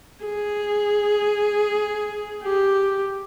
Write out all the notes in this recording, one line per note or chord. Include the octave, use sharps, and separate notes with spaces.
G#4
G4